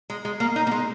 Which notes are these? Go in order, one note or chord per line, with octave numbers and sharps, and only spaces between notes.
G#3
G#3
A#3
D#4
A#3
G#3